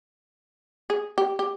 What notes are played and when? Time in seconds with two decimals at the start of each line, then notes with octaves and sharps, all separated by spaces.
0.90 G#4
1.18 G4
1.39 G4